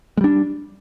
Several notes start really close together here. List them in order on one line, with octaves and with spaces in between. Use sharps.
G#3 G3 D4